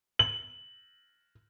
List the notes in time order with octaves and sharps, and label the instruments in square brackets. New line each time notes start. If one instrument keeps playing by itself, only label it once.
[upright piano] F#7